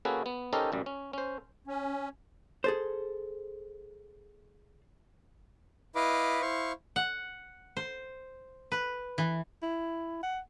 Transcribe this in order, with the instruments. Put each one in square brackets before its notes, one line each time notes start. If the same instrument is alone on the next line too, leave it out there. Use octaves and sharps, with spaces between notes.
[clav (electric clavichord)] A#3 C#4 F#4 G#4 A4 B4
B3
C#4 D#4 G4 A4 A#4 C5
A1 F#2 G3
C#4
C#4 C5
[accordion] C#4
[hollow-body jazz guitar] G#4 A4 C5
[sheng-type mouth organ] E4 B4 D#5 F5 B5 D6
E4 C5 F5 C#6
[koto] F#5
C5
B4
E3
[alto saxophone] E4
F#5